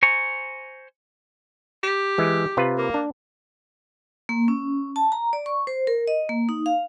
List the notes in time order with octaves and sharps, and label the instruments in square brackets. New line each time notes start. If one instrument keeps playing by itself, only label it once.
[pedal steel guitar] C5 G#5 A#5 C#6
[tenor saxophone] G4
[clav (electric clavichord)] E3 G#3
C3 F4 B4
[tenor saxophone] A#3
[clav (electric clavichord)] D4
[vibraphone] A#3
C#4
A5
A#5
D5
C#6
C5
A#4
D#5
A#3
D#4
F5